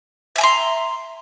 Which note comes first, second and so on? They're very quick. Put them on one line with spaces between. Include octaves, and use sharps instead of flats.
E5 G#5 A#5 C6